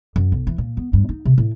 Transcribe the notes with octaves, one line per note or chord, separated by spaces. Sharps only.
F#2
B1
E3
A#2
B3
G2
D#4
C3
A2